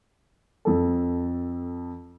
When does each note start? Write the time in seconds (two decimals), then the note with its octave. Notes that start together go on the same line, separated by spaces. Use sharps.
0.65 F2 A4